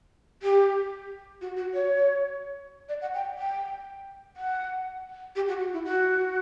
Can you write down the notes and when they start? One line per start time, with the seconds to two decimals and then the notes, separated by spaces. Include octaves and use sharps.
0.43 G4
1.41 F#4
1.57 F#4
1.74 C#5
2.89 D5
3.02 F#5
3.14 G5
3.38 G5
4.37 F#5
5.36 G4
5.48 F#4
5.60 F#4
5.73 E4
5.85 F#4